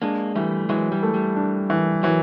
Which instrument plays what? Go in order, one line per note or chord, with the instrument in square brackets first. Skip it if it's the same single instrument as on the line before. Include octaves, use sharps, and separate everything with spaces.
[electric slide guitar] G#3 A#3 [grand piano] D4
[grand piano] E3 [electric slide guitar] G3 A3
[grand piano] E3 [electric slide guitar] F#3 G#3
[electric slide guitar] G3
[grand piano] A3
[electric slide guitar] G3
[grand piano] D4
E3
[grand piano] E3 [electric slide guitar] F#3